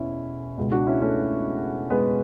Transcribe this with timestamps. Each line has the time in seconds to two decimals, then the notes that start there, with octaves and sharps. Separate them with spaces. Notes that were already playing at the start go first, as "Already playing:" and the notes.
Already playing: E2 B2 C#4 E4
0.58 C#2 B2
0.72 D4 F#4
0.87 C#4 E4
1.01 A3 C#4
1.90 G#3 B3